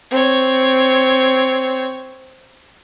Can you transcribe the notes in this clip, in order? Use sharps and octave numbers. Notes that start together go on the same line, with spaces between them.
C4 C#5